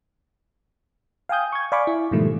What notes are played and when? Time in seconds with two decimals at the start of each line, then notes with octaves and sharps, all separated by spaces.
1.29 F5 G5 G#5 D#6 G6
1.52 C#6 G#6
1.72 D5 F5 G#5 B5 C#6 D6
1.87 E4
2.11 G#2 B2 D#3 F3 G3 A3